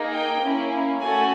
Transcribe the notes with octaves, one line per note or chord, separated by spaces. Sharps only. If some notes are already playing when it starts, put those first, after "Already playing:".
Already playing: A#3 D#4 G#4
G5
A#3 C#4 E4
A3 C#4 F#4 A4 G#5